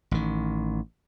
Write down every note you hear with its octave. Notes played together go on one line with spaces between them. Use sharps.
A1 D#3